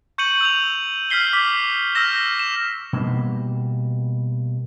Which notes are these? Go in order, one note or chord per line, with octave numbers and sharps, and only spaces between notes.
C#6 G6 C#7 D#7 F#7
E6 G6 F7
F6 G6 B6 C7 G7
D6 B6
E6 F6 G6 A#6 E7
E7
B2 G3 A#3